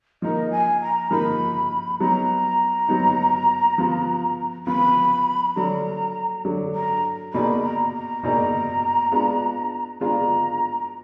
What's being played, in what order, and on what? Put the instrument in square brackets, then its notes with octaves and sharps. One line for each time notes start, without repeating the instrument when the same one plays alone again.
[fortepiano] F3 A#3 D#4 A#4 [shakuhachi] D#5
[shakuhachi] G#5
A#5
[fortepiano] F3 A#3 D#4 A#4 [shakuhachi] B5
[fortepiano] F#3 B3 D#4 [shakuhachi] A#5
[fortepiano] F#3 B3 D#4
F3 B3 F4
[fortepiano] F3 B3 F4 [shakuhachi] B5
[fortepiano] D3 F#3 D4 [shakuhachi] A#5
[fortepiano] D3 F#3 D4
[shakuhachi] A#5
[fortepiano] B2 A#3 D#4 G#4 D5 [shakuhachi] B5
[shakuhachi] A#5
A#5
[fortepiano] B2 A#3 D#4 G#4 D5
G#3 B3 D4 F4
[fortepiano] G#3 B3 D4 F4 [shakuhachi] A#5